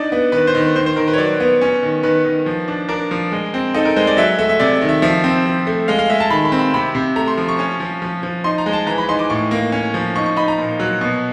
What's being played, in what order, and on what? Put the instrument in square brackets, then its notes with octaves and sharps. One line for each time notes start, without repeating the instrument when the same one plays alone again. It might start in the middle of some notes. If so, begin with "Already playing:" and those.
Already playing: [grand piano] D4 D#4 D5
B3
D#3 B4
C5
D#3
B4
D#3 C5
C5
D#3 A#4
B4
C#5
F#3 D5
B3
C#4
D#3
D#3 B4
D#3
F3
D4
D4 A#4
F3
G#3
C4
D#4 A4
A#4
G#3 C5
D5
F#3 E5
A3 E5
E5
C3 D5
D#3
E5
F3 E5
C4
F3
A3
G#3 F5
F5
G#3 E5
A5
D#3 B5
B5
C4
B5
C3 B5
C3
A3 A#5
C6
F3
C#6
C#4
F3
F3
F3
D#4 C6
A#5
G#3
A5
E3 A#5
B5
D#4 C6
D6
A2 C#6
A#3
C#4
F3
D#4 C#6
C#6
D#4 B5
A#5
A#2
F#3
B2